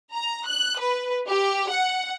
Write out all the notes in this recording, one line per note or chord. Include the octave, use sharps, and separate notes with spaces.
A#5
F#6
B4
G4
F#5